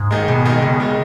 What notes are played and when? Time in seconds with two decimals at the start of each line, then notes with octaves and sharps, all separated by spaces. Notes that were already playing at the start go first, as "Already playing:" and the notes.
Already playing: G#2
0.11 D#3 G#3
0.28 E2 B2
0.45 D#3 G#3
0.62 E2 C#3
0.80 D#3 G#3